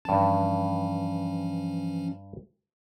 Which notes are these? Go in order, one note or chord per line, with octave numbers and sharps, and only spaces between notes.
G2 E3 F3 C#4 A5